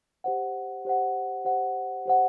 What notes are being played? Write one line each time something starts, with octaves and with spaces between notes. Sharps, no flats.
G4 C5 F#5
G4 C5 F#5
G4 C5 F#5
G4 C5 F#5